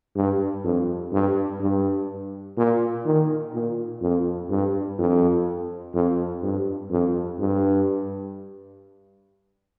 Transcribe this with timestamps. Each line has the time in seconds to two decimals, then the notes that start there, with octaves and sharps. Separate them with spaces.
0.16 G2
0.64 F2
1.12 G2
1.61 G2
2.57 A#2
3.05 D#3
3.53 A#2
4.02 F2
4.50 G2
4.98 F2
5.94 F2
6.43 G2
6.91 F2
7.40 G2